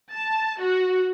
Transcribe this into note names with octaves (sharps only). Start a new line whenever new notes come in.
A5
F#4